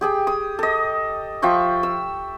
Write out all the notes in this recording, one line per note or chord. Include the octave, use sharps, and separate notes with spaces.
G4 G#4 G5
D#6
A4 D#5
F3 E5 G5 C#6
E6